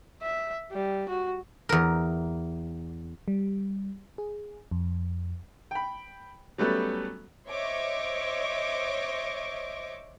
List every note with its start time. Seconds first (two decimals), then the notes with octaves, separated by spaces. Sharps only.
0.22 E5
0.72 G3
1.09 F#4
1.69 E2 A#4
3.28 G3
4.18 G#4
4.71 F2
5.71 G5 B5
6.58 F#3 G3 A3 B3 C#4 A4
7.48 C5 C#5 D#5 E5 C#6 D6